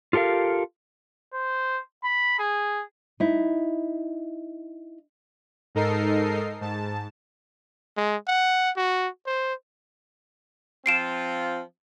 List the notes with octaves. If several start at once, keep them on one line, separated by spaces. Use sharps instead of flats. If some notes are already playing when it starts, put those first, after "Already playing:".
F4 G4 A4 A#4 F5
C5
B5
G#4
D#4 E4
G#2 D#4 A4 A#4 D#5 C7
G#2 A5
G#3
F#5
F#4
C5
F3 C4 F4 C7 D7 E7